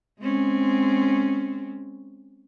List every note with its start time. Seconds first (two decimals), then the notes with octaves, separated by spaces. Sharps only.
0.20 G#3 C4 C#4